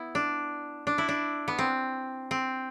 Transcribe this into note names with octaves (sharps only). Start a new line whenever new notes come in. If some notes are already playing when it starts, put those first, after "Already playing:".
Already playing: B3 E4
D4
D4
E4
D4
B3
C4
C4